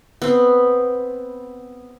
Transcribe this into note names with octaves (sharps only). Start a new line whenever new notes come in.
B3 C4